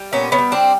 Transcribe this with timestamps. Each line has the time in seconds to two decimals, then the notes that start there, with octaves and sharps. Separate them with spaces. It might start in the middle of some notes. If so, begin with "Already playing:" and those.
Already playing: G3
0.13 A#2 B3 C#4
0.32 B3 C#4
0.38 G3
0.52 C4 D4